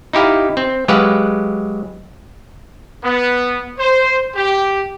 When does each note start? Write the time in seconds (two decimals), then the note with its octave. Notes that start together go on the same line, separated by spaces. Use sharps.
0.13 D#4 E4 G4 F5
0.57 C4
0.88 F#3 G#3 G4 B4 F5 F#5
3.04 B3
3.79 C5
4.35 G4